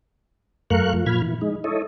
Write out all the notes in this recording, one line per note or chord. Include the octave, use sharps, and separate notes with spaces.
F#2 A3 A#4 F5 C#6 F#6
F3
A#2 F3 B5 F6 G#6
E3
G#3 D#4
E4 A4 C#5 D#5